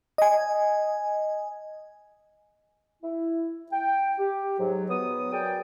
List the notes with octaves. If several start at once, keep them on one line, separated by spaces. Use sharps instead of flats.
D#5 G#5
E4
G5
G4
G#2 F#3
F#3 B3 D#6
F#3 G#4 A#4 D5 G5